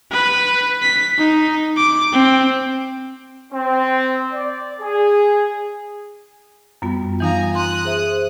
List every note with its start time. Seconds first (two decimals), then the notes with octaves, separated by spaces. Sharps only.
0.11 B4
0.82 B6
1.18 D#4
1.77 D6
2.13 C4
3.53 C4
4.33 D5
4.80 G#4
6.82 F#2 G3 B3 F4
7.20 E3 D#4 F5 G#5 A#5
7.55 C6 D#6 F#6
7.85 G#4 C5 E5